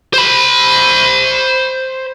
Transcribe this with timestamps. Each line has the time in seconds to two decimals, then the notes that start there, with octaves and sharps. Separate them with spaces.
0.14 C5 B5